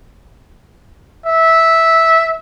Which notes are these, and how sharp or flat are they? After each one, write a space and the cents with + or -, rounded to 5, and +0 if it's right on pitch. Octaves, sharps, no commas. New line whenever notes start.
E5 -10